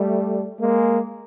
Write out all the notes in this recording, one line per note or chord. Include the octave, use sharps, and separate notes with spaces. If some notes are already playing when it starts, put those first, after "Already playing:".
Already playing: G3 A3
G#3 A#3